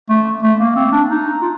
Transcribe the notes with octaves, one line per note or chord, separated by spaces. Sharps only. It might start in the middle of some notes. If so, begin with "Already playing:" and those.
A3
A3
A#3
C4
D4
D#4
F4